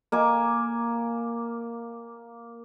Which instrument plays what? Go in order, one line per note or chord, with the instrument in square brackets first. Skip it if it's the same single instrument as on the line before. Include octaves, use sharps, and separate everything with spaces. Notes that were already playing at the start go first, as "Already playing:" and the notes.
[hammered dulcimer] A#3 G#5 D6